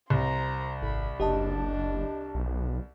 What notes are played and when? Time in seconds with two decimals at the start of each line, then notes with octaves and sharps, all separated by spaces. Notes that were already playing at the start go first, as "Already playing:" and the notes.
0.10 C2 C5 A#5
0.82 G#1 B5
1.20 F#1 D4 G4 D#5 A5
2.35 B1